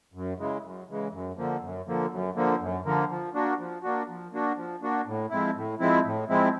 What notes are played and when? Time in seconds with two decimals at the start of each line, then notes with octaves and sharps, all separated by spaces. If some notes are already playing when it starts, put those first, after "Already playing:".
0.14 F#2
0.38 C#3 E3 G#3
0.63 F#2
0.89 C#3 E3 G#3
1.13 F#2
1.37 D3 F3 A#3
1.62 F#2
1.87 D3 F3 A#3
2.10 F#2
2.35 D3 F3 A#3
2.61 F#2
2.85 D3 F3 A#3
3.10 F3
3.34 A#3 D4 F#4
3.59 F3
3.83 A#3 D4 F#4
4.08 F3
4.32 A#3 D4 F#4
4.56 F3
4.82 A#3 D4 F#4
5.06 A2
5.30 F3 G#3 C4 E4
5.55 A2
5.80 F3 G#3 C4 E4
6.05 A2
6.29 F3 G#3 C4 E4